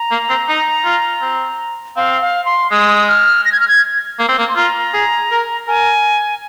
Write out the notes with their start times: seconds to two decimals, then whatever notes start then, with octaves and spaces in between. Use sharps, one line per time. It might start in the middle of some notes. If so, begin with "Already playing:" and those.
Already playing: A#5
0.11 A#3
0.29 C4
0.49 D#4
0.85 F4
1.22 C4
1.96 C4 F5
2.22 F5
2.45 C6
2.71 G#3 D#6
3.08 F6
3.45 A#6
3.52 G#6
3.60 F6
3.68 G#6
4.19 A#3
4.29 C4
4.39 A#3
4.49 C6
4.56 F4 A#5
4.94 G#4
5.31 A#4
5.68 A#4 G#5